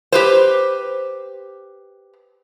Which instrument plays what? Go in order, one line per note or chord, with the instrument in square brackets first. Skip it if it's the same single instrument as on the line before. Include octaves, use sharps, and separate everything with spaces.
[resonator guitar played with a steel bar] G4 B4 C5